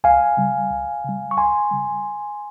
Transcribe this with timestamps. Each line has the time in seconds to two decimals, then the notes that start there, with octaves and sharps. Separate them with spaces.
0.04 C#2 F5 G#5
0.37 C#3 G3
0.71 C#2
1.04 C#3 G3
1.31 C#6
1.37 C#2 G#5 C6
1.71 C#3 G3